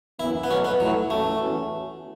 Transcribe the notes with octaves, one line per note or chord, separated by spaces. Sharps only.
F#2 E3 B3 E4
B3
E2 B2 F#3 A3 C#4 F#4
B3
A2 F#3 A3 E4 A4
A2 E3 A3 C#4 F#4 A4
E2 E3 A3 C#4 F#4